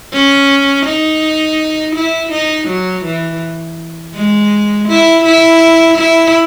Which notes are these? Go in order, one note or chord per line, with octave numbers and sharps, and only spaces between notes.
C#4
D#4
E4
D#4
F#3
E3
G#3
E4
E4
E4